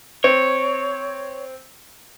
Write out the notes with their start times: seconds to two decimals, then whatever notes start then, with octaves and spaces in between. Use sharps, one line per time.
0.24 C4 C#5